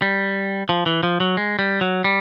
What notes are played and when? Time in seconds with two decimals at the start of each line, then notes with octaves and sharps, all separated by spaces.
0.02 G3
0.69 F3
0.86 E3
1.03 F3
1.20 F#3
1.37 G#3
1.59 G3
1.81 F#3
2.04 G3